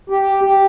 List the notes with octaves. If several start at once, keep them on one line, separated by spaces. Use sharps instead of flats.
G4
G4